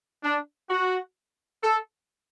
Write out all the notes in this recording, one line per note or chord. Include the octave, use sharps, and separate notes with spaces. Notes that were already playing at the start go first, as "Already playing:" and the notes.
D4
F#4
A4